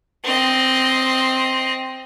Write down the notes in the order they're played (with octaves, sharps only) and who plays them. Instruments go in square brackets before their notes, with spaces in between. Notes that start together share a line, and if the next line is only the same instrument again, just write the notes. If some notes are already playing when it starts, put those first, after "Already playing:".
[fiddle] C4 D#5